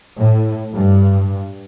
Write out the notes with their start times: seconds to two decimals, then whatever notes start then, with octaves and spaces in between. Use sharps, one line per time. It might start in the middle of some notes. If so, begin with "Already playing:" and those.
0.19 A2
0.73 G2